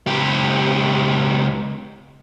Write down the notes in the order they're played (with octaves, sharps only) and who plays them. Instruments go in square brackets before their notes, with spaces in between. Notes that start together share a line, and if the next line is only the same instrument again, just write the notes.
[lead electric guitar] C#2 G4